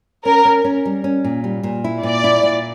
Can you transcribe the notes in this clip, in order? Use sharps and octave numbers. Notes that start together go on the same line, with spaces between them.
C#4 A#4
C#4
C#4
G3
C#4
A#2
G3
A#2
E4
A#2 D5
E4
A#2